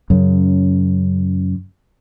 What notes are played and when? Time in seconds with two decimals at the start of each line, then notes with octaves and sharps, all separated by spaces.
0.10 F#2 C#3